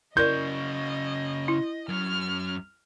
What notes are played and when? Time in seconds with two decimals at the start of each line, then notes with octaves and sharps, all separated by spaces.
0.17 C#3 E4 F#4 A#4 D5 D#5 G6
1.48 E4
1.89 F#2 F#3 F6